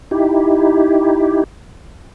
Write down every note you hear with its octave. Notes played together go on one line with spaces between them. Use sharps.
D#4 E4 G4